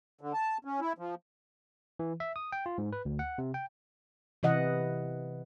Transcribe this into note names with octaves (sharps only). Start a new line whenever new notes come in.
D3
A5
C#4
E4
F3
E3
E5
D#6
G5
F4
G#2
B4
D2
F#5
C3
G5
C3 E3 D#5 F#5